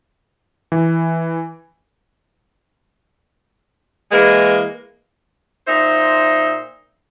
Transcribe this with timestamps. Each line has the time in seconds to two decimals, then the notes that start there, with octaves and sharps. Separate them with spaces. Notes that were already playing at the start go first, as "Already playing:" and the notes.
0.72 E3
4.12 E3 G#3 A#3
5.67 A#2 D#4 C5 E5